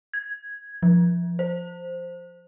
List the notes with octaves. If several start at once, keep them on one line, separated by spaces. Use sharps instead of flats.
G#6
F3
C5